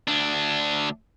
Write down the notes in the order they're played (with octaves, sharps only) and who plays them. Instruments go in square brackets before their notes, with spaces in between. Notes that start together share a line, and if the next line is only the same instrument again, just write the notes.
[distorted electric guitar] D2 D4